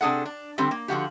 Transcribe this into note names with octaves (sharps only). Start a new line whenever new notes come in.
C3 D4 G#4 A4 F#5
D4
D3 G3 C4 G4
A#3
D3 F3 F#4 G4